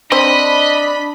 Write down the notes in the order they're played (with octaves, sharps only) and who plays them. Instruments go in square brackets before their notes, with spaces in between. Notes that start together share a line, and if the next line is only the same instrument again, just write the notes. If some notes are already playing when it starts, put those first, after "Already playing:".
[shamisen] C4 C5 [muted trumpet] D4 [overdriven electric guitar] D#5 [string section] B5